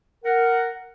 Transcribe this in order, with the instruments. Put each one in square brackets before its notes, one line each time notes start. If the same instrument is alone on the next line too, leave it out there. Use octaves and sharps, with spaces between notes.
[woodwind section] A#4 F#5